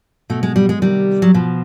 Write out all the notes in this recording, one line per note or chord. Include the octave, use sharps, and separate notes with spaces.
B2 A3
G#3
G3
G#3
C3 D#3 G3
F#3
B2 F3